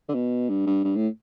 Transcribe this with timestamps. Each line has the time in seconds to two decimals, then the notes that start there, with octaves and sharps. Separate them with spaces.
0.09 D3
0.14 B2
0.49 G2
0.67 G2
0.84 G2
0.96 A2